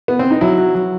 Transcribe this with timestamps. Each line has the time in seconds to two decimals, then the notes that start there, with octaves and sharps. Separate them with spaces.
0.08 B3
0.19 C4
0.31 D#4
0.41 F#3 E4
0.58 F#3
0.75 F#3